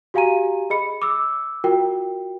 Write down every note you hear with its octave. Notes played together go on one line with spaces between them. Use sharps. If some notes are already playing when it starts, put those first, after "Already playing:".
F#4 G4 F5 G#5 A#5 D#7
G#4 D#5 B5 C#7
D6 E6
F4 F#4 A#4 G5